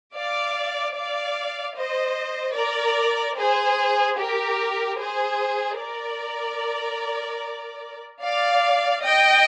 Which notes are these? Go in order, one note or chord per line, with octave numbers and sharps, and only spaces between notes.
D5 F5
D5 F5
C5 D#5
A#4 D5
G#4 C5
G4 A#4
G#4 C5
A#4 D5
D5 F5
D#5 G5